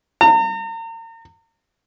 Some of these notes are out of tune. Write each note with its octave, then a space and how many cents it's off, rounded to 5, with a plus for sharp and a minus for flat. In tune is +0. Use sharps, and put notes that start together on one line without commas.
A#5 -40